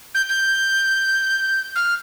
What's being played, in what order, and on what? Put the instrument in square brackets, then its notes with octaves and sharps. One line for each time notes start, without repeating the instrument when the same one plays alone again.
[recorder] G6
G6
F6